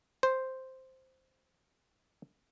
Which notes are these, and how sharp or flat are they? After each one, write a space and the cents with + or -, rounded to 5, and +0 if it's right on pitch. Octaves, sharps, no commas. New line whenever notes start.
C5 +0